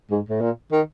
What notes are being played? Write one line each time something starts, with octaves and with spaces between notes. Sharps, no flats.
G#2
A2
A#2
D#3